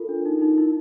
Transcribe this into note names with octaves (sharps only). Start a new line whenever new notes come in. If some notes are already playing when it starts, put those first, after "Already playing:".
Already playing: F4 A4 A#4
D4
D#4
D#4
E4